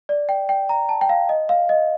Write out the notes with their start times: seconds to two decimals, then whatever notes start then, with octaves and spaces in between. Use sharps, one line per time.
0.09 D5
0.29 G5
0.49 G5
0.69 A#5
0.89 A5
1.01 G5
1.09 F5
1.29 D#5
1.49 F5
1.69 D#5